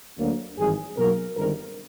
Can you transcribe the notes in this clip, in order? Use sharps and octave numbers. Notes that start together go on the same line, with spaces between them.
D2 D3 F#3 A#3
G#1 G2 E3 G#3 G#4
B1 B2 F#3 A#3 A#4
G1 G2 D#3 G#3 C4 A#4